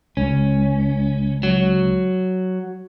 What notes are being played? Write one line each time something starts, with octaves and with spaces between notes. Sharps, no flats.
C#2 C#4
F#3